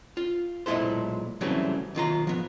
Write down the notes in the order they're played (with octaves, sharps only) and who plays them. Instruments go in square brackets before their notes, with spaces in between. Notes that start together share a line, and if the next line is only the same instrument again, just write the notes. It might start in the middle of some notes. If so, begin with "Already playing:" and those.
[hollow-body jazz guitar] F4
B1 A#2 G#3 E4 A4 C5
C#3 E3 F#3 G3 A3 C4
B1 D#3 F4 A#5
F3 B3